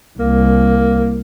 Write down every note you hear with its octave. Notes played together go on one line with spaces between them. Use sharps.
C2 A#3